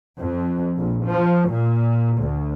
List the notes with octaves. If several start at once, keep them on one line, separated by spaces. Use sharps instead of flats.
F2
A#1
F3
A#2
D2